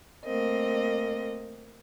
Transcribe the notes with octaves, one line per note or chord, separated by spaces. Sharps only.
A3 A#3 C4 D#5